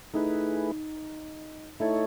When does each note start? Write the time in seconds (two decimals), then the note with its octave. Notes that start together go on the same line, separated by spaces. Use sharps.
0.13 A3 D#4 E4 G#4 B4
1.80 A3 D#4 E4 A4 C#5